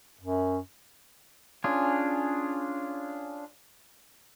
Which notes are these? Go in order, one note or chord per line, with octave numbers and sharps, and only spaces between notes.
F#2
C#4 D4 F4 G#4